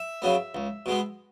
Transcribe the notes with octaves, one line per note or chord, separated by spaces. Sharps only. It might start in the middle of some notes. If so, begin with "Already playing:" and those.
Already playing: E5
C#3 F#3 B3
C#2
B2 G#3 B3